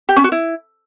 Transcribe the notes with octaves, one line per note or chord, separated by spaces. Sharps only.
G4
C#4
F#4
E4